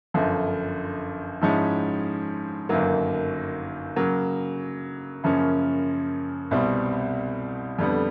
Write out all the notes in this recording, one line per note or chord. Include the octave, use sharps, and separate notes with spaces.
G1 F#2 D3 F3
G#2 F3 G#3 C#4 E4
G1 F#2 D#3 F#3 A#3
C#3 F#3 A#3
F#2 C#3 F3 A#3 C#4
C2 B2 G3 C4
F2 D3 G3 B3